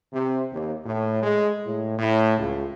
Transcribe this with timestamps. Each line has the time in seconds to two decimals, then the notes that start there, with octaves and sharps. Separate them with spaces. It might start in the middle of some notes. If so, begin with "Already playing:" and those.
0.13 C3
0.53 D#2
0.86 A2
1.23 G#3
1.64 A2
1.98 A2
2.38 C#2